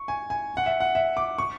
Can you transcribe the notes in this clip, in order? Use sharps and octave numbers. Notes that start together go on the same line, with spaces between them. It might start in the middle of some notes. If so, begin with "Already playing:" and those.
Already playing: C#6
G#5
G#5
F#5
E5
F#5
E5
D6
C#6